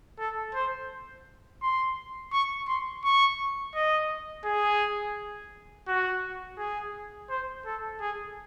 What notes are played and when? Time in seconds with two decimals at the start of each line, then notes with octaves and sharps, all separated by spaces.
0.19 A4
0.55 C5
1.62 C6
2.32 C#6
2.68 C6
3.04 C#6
3.75 D#5
4.45 G#4
5.88 F#4
6.58 G#4
7.30 C5
7.66 A4
8.01 G#4